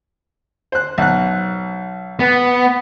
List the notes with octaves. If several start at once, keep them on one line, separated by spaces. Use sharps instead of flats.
C5 F#6
B1 F#6
B3